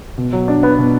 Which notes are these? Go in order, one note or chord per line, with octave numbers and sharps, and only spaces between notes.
B2
F#3
D4
B3
B2